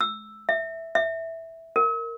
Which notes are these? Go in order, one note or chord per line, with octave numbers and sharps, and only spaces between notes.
E6
E5
E5
A#4